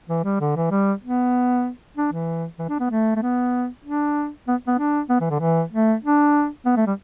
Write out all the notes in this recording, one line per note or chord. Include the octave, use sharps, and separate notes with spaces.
E3
G3
D3
E3
G3
B3
D4
E3
E3
D4
B3
A3
A3
B3
D4
B3
B3
D4
B3
E3
D3
E3
A3
D4
B3
A3
G3